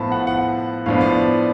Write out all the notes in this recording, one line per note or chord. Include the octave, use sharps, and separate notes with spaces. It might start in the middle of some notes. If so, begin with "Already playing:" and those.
Already playing: A2 F3 B3 A5 B5
F#5
F#5
A2 F3 B3 D4 F5
D5